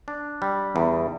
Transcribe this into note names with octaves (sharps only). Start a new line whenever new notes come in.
D4
G3
E2